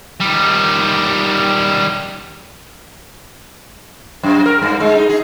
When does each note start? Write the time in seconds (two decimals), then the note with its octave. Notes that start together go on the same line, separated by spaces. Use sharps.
0.20 D#3 G3
4.23 F#2
4.46 A#4
4.62 G2
4.80 G#3
4.95 D#4
5.09 G#4